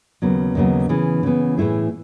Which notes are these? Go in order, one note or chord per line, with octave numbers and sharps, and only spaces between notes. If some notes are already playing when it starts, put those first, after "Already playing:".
D#2 C#3 F#3 B3
D#2 C#3 F#3 B3
C#3 E3 B3
C#3 E3 B3
A2 E3 A3 E4 G#4